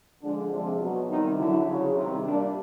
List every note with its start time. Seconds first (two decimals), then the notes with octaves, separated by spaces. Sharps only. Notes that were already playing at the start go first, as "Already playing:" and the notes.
0.21 D3 F3 G#3 D4
0.50 C3 F3 G#3 D4
0.79 B2 F#3
1.07 C3 D#3 G3 D#4
1.36 D3 F#3 E4
1.65 C#3 F#3
1.93 C3 D#3 G3
2.22 A#2 G3 D4